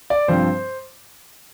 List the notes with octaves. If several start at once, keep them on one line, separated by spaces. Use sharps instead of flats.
D5
G2 F3 C4 C5